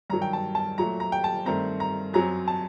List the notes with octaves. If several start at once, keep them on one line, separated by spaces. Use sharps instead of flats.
G2 D#3 F#3 A#5
G5
A5
A5
A#2 F#3 A3 A#5
A#5
G5
A5
G2 D#3 A3 C4 A#5
A#5
F#2 F#3 C4 A#5
A5